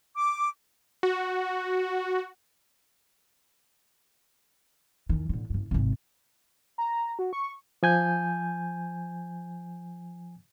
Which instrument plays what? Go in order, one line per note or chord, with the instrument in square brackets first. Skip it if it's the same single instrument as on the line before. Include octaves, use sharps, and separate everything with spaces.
[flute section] D6
[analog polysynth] F#4
[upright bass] E2 D#3
A2 D3
F#1 G2
G#1 C3
[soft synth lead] A#5
F#4
C#6
[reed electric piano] F3 G#5 G6